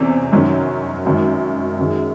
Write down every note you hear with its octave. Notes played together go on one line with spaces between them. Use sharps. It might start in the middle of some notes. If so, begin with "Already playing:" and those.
Already playing: E2 C3 E3 A3 C#4
F#2 D#3 F#3 C#4
G#1 F#2 D#3
F#2 D#3 G#3